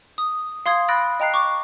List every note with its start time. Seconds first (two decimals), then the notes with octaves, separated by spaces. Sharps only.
0.18 D#6
0.66 F5 C6 D#6 G#6
0.88 B5 E6 F#6 A6 A#6 D7
1.20 D#5 G5 A#5 F#6 C7
1.34 C#6 D6